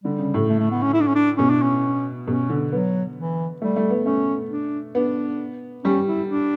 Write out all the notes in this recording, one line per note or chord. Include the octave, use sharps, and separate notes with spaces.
D3 G3
C#3
A2
A3
A3
B3
C#4
E4
D4
C#4
D4
B2 C#4
D4
C#4
B2 C#4
D3
F#3 B3
E3
G3 A3
A3
B3
A3 C#4
D4
B3 D4
G3 C#4
E4
D4